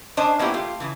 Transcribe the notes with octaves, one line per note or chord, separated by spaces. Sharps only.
C#4 D4 C5 D#5 A5
A#3 B3 C#4 D4 E4 G4
A3 F4 G4
C#3 E3